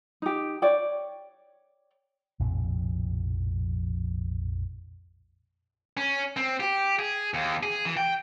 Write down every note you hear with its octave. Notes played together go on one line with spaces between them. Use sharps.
D#4 G4
C#5 D5 G5
A#1 F2 A2 C3
C#4
C4
G4
G#4
D#2
G#4
E3
G5